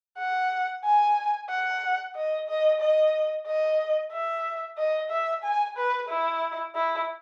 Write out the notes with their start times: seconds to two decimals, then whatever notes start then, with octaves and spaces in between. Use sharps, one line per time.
0.19 F#5
0.84 G#5
1.50 F#5
2.16 D#5
2.49 D#5
2.80 D#5
3.47 D#5
4.12 E5
4.78 D#5
5.10 E5
5.44 G#5
5.77 B4
6.09 E4
6.75 E4